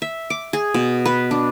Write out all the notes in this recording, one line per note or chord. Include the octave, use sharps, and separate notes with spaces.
E5
D6
G#4
B2
B4
D4